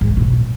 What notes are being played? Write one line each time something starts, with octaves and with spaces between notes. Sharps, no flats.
G#2
C3
B2